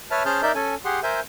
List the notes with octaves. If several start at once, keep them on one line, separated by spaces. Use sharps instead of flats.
B4 C#5 E5 A5 F6
C#4 G#4 C5 A5 F6 G6
D#4 A#4 D5 E5 G6
C#4 A4 G#5
G4 G#4 F#5 C6
A#4 C5 E5 G#5 G6